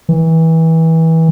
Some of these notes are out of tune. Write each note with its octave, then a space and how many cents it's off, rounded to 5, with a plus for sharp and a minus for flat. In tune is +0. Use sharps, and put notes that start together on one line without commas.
E3 -25